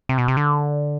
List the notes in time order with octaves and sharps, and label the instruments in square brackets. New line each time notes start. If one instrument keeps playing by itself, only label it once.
[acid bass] C3
B2
C3
D3